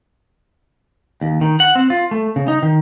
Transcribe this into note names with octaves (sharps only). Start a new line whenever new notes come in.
D#2
D#3
F#5
C4
F4
A3
C#3
D#4
D#3